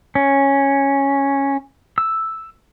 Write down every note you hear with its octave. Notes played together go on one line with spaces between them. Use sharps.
C#4
E6